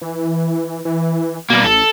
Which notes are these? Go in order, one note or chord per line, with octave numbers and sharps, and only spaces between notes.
E3
E3
B2 G3 A#3
A1 A4